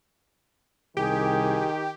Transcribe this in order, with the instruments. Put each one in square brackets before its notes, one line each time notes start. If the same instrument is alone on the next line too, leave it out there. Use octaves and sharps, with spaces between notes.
[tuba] C2 [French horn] D#3 [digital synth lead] G4 [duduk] G#4